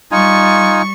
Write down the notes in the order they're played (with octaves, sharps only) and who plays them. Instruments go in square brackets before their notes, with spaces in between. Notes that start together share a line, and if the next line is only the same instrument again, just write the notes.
[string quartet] G3 C#6 [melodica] D#4 F4 G#5